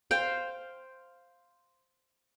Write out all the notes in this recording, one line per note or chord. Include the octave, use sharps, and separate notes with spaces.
C5 F5 G5